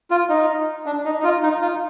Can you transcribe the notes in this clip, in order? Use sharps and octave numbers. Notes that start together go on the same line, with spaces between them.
F4
D#4
D4
D#4
D#4
F4
D#4
F4